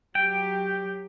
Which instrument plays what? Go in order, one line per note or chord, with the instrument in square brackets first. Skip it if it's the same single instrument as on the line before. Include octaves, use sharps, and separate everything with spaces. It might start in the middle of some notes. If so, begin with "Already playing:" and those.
[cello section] F#3 G4 [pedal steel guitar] G5